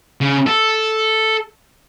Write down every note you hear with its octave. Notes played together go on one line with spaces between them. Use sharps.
C#3
A4